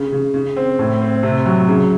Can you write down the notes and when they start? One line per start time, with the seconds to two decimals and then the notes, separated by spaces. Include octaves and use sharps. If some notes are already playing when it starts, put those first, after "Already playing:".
Already playing: C#3
0.12 C#3
0.34 C#3
0.56 C4
0.79 A2
1.02 C4
1.23 C3
1.46 F#3
1.68 C#3